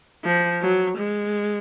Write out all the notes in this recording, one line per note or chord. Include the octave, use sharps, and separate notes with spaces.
F3
F#3
G#3